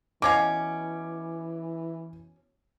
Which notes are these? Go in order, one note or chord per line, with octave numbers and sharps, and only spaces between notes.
B2 E3 C#4 F5 D6